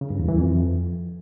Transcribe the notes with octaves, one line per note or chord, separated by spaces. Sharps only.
C#3
G2
E2
E3
F2